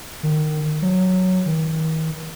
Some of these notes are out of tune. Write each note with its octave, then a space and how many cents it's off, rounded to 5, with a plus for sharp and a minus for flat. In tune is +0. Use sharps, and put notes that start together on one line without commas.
D#3 -20
F#3 +0
D#3 +40